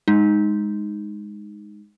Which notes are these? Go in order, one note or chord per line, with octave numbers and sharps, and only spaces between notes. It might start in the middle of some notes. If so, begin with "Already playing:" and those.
G#3 D#4